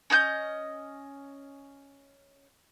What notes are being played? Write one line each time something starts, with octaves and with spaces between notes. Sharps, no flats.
C#4 D#5 G5 G6